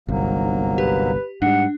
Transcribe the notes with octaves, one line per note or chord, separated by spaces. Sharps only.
G1 C2 G#2 F#3 A#3
G4 B4
G#2 G3 D4 F#5